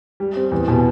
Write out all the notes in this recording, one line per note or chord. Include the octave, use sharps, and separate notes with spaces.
G3
C4
E2
B2